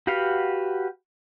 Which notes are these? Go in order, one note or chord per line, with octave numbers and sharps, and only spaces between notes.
F#4 G4 B4 F5 F#5